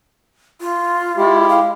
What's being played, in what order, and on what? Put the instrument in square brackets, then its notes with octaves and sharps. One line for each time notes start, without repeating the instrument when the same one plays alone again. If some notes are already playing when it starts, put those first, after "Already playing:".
[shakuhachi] F4
[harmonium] G#3 E4 G4
[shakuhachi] F5